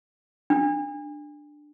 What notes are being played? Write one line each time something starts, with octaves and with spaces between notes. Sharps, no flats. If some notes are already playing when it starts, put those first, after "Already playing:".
D4